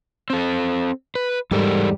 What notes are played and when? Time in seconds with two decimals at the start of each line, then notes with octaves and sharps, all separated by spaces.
0.30 C4 A4
1.15 B4
1.51 E2 G#2 G3 A4 A#4